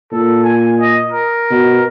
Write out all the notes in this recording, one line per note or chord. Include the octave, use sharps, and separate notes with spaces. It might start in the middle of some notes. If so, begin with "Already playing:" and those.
A#2 A4
G#5
D#5
A#4
B2